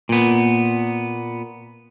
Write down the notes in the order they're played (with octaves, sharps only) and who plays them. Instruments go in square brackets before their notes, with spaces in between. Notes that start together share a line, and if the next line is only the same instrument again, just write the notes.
[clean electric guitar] A#2 B3